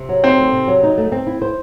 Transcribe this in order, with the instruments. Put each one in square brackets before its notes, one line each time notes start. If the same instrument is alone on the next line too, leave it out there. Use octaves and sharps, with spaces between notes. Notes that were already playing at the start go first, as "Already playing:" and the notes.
Already playing: [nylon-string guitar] C3
F#3
[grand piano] C4 [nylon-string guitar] D#4
[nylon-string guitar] A3
C3
F#3
D#4
A3
C4
E4
C5